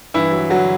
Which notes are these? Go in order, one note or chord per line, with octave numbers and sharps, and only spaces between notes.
G2 E3 E4
F#3
D3 F#3 F#4